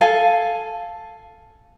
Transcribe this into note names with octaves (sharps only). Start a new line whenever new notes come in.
A4 F5 G#5